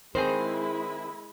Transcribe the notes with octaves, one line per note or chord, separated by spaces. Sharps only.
D#3 G#3 C4 E4 G#4 C5 B5